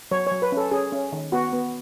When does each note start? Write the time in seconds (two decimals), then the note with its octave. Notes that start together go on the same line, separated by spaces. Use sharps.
0.11 F#3 C#5
0.27 F#3 C#5
0.42 B4
0.52 C#4 A4
0.71 C#4 G#4
0.92 C#4
1.12 D#3
1.32 B3 F#4
1.53 B3